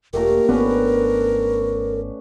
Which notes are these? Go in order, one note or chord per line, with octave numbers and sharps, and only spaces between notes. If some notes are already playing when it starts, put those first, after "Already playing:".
E1 A#2 A3 G4 A#4
G#1 B3 C#4 D4 B4